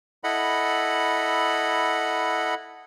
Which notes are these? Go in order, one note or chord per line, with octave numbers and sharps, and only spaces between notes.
E4 A4 D#5 F#5 B5